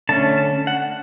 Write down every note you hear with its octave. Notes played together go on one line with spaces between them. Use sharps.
D3 A3 C#4 A5
A5
F#5